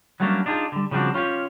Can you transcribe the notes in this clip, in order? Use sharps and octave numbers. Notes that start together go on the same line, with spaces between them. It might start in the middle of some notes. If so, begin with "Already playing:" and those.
F#3 G3 A3 A#3 C#4 D4
D4 D#4 F4 G4 G#4
D3 G3
C#3 F3 G3 C4 D4 F#4
C#4 F4 G4 C#5